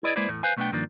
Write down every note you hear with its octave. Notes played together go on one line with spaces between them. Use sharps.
E4 G#4 B4 D5 D#5
G#3 A#3 E4 B4 C5 D5
E2 A2 A3
B4 C5 F5 G#5
B1 A3 B3 C4 D4 G5
G2 D#3 F3 A#3 D4